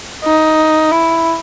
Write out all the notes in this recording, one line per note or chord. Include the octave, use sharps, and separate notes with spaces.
D#4
E4